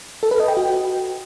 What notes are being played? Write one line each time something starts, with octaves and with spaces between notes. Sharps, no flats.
A4
B4
D#5
G5
F#4